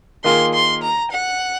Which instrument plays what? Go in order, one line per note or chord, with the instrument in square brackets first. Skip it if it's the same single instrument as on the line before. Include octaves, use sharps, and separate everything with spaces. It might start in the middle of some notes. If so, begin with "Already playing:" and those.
[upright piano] D#3 A#3 F4 G#4 [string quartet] C6
[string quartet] C6
A#5
F#5